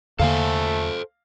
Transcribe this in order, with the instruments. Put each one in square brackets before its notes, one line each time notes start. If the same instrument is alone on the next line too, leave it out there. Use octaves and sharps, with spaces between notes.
[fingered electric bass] E2 D3 A#3 [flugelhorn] A3 [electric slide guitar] A4 C5 G#5 [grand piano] F5